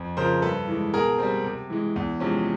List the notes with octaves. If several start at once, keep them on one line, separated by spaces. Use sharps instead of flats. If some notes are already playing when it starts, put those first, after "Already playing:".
Already playing: F2
C#3 F3 A#4 C5
G2 A4 B4
E3 G#3
B2 G#4 A#4
G3 C4
C3
E3 G#3
E2
C3 F3 G#3 C#4